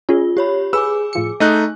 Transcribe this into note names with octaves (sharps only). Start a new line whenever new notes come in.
C#4 F4 G#4
G4 C#5 B5
G#4 B4 G#5 D6 E6
A2 F3 C#7
A3 D#4 D#5 F#6